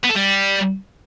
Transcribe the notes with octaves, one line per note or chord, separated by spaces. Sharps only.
B3
A4
G3